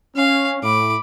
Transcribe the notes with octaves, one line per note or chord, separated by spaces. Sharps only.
C#4 F5
A2 B5 D6